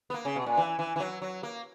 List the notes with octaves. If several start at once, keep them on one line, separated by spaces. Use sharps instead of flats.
B3
A#3
C#3
B2
A#2
E3
E3
E3
F#3
F#3
A#3